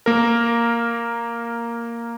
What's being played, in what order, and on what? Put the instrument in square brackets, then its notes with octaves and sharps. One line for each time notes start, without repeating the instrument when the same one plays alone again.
[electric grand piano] A#3 A#4